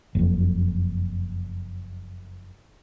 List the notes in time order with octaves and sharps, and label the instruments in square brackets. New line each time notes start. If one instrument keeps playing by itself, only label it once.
[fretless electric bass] F#1 F2